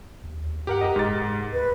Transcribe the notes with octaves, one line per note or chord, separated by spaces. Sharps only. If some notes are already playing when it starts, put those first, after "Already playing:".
D#2
G2 G4 A#4 F#5
F#2 G4 A#4 D#5
F1 G#2 A6
D2 B4